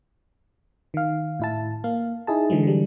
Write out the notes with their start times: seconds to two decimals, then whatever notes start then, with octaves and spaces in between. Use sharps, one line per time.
0.94 D#3 F5
1.40 A2 E4 A5
1.84 A#3 F5
2.27 D#4 E4 G#4 A5
2.50 D3 E3 F#3 G#3
2.63 D3 E3 G3